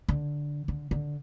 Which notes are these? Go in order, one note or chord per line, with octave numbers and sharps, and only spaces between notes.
D3
D3
D3